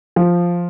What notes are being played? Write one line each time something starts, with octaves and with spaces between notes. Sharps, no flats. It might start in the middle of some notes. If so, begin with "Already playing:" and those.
F3